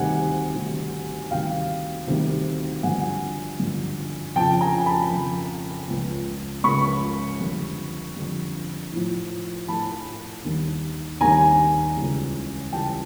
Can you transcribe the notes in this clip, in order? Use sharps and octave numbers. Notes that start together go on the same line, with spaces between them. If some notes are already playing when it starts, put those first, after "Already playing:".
Already playing: D2 C3 D#3 G3 F#5 G#5
D2 C3 D#3 G3
D2 C3 D#3 G3 F5 G5
D2 C3 D#3 G3
G2 D3 F3 F#5 G#5
G2 D3 F3
F2 C#3 F3 G5 A5
G#5 A#5
A5 B5
F2 C#3 F3
C#2 C#3 F3
C#2 C#3 F3 B5 C#6
F2 D3 G3
F2 D3 G3
A2 F3
A2 F3 A5 B5
D#2 D#3 G3
D#2 D#3 G3 G#5 A#5
C#2 C#3 E3 G3
C#2 C#3 E3 G3 G5 A5